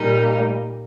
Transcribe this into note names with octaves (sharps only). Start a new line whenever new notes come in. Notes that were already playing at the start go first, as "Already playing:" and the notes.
Already playing: A#2 G3 A#3 D#4